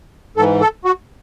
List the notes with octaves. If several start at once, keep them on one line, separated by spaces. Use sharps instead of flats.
G#2 E3 A4
A4
F#4